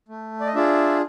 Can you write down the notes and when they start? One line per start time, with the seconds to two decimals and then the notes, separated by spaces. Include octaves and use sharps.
0.08 A3
0.40 D5
0.47 D#5
0.55 D4 F4 G#4 D5 E5